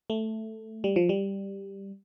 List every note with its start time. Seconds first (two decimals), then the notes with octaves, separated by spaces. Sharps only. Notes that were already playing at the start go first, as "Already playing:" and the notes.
0.10 A3
0.84 G3
0.96 F3
1.09 G3